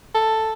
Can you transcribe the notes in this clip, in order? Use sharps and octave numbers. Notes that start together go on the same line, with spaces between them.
A4